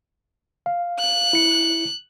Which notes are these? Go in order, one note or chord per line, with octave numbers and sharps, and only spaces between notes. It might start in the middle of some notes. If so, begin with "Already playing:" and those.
F5
F#6
E4 C#7